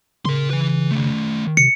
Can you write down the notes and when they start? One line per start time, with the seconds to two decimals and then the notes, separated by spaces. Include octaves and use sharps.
0.25 C#3 A#4 C6
0.51 E3 B4
0.91 D#3 A3
1.57 C3 C#7